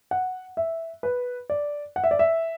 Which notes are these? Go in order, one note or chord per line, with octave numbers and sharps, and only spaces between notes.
F#5
E5
B4
D5
F#5
E5
D5
E5